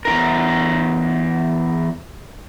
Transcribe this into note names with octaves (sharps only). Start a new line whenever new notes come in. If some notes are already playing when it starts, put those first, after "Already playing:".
E2 C#3 A#4